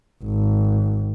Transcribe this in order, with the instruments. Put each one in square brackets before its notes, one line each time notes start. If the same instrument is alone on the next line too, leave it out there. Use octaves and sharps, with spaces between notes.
[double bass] G#1